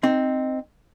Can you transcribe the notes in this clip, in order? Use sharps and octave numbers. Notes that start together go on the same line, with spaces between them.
C4 D#4